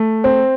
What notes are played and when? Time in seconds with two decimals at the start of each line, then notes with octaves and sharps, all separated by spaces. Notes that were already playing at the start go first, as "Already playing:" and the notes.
Already playing: A3
0.24 C4